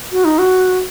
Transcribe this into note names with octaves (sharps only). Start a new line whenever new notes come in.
F#4
D#4
F#4